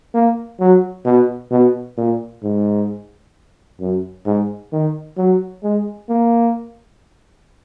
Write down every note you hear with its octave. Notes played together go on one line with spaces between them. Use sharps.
A#3
F#3
B2
B2
A#2
G#2
F#2
G#2
D#3
F#3
G#3
A#3